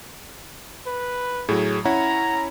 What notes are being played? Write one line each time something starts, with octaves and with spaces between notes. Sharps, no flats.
B4
A2 F#3 G#4
C#4 E4 C#5 F#5 A#5